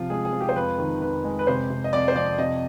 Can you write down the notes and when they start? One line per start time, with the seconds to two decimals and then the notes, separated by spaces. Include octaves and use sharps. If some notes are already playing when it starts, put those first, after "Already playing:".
Already playing: C3 F3 F4
0.10 G#3 G#4
0.25 G#4
0.33 F3
0.41 G4
0.49 C5
0.56 F2 B4
0.78 D#3
1.02 F2 B4
1.24 G#3
1.39 B4
1.47 C3 C5
1.70 C3
1.84 D#5
1.93 F2 D5
2.08 C5
2.16 F2 D5
2.38 C3 D#5